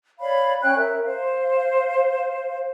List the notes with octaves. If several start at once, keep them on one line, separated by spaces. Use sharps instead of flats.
C#5 D5 F5 B5
C#4 C#5 G5 F#6
A#4 E5
C5 F5